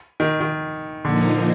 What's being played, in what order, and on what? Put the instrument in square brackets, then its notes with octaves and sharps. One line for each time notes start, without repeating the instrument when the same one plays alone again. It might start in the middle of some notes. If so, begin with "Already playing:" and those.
[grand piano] D#3
D#3
[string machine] A#2 F3 A#3 D#4 [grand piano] D3